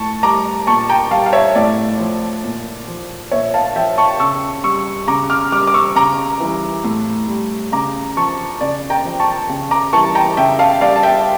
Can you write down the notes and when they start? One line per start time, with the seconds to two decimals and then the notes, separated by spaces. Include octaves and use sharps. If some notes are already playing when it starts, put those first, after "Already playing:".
Already playing: A2 A5 C#6
0.23 G3 A#5 D6
0.67 A#2 A5 C#6
0.89 G5 A#5
1.11 G3 F5 A5
1.26 F5
1.33 C#5 E5
1.55 A2 D5
2.00 F3
2.44 A#2
2.88 F3
3.31 A#2 C#5 E5
3.54 F5 A5
3.76 F3 E5 G5
3.98 A5 C#6
4.20 C#3 C#6 E6
4.64 G3 C#6 E6
5.07 C#3 A#5 D6
5.30 D6 F6
5.52 G3 D6 F6
5.67 D6
5.74 C#6 E6
5.96 C#3 A#5 D6
6.40 E3 G3
6.84 A2
7.28 G3
7.72 C#3 A#5 D6
8.17 F3 A5 C#6
8.61 C#3 D5
8.90 G5 A#5
9.05 F3
9.20 A5 C#6
9.49 C#3
9.71 A#5 D6
9.93 E3 G3 A5 C#6
10.15 G5 A#5
10.37 C#3 E5 G5
10.59 F5 A5
10.81 G3 D5 F5
10.96 A5
11.03 E5 G5